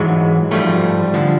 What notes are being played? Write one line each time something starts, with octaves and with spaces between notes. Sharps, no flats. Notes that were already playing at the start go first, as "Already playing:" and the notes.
Already playing: G#2 E3 F#3 G#3
G#2 F3 G3 A3
D3 F3